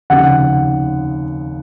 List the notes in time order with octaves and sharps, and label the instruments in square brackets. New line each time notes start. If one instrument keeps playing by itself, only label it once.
[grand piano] F1 D#2 C#3 F#5